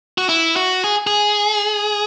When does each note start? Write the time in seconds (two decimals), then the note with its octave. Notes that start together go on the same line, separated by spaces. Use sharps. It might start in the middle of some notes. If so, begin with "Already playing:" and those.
0.18 F#4
0.29 E4
0.56 F#4
0.84 G#4
1.07 G#4